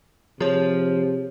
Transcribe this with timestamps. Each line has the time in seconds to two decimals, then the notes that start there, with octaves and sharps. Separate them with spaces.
0.40 C3 F3 G#4 C#5